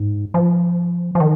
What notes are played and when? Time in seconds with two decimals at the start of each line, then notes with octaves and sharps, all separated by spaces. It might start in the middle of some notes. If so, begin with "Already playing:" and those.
Already playing: G#2
0.34 F3
1.15 F3
1.20 D#3